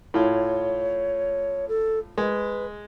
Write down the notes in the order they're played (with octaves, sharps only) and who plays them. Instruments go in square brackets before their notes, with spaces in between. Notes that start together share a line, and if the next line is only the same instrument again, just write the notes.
[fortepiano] A2 F4 [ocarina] C#5
[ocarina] A4
[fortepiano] G#3 [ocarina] B4